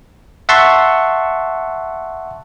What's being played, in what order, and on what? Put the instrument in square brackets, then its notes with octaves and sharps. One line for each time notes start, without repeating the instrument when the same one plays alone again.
[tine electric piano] E5 F#5 A5 C6 C#6